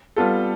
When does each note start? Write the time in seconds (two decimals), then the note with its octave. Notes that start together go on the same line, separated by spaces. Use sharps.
0.16 G3 B3 F4 A4